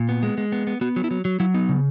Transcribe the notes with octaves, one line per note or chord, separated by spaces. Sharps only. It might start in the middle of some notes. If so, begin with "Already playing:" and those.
Already playing: A#2
B3
G#3
G#3
B3
B3
B3 F#4
F#3
E4
F#3
F#3
F#3 E4
B3 D#4
C#3